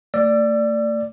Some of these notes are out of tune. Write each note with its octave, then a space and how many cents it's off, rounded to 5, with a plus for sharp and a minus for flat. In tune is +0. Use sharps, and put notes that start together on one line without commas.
A3 +40 D5 +0 E6 +35